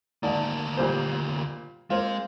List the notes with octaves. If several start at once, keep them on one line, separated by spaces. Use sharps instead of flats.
G#1 D2 A#3 D5 A5
A#2 G3 C5
G#3 A#3 C4 F4